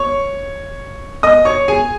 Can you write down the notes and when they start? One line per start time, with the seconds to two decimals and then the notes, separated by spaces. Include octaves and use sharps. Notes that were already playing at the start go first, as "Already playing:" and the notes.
Already playing: C#5 C#6
1.23 D#5 D#6
1.45 C#5 C#6
1.68 G#4 G#5